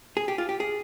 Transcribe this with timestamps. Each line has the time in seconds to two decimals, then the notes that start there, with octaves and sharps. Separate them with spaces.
0.17 G#4
0.28 G4
0.38 F4
0.49 G4
0.60 G#4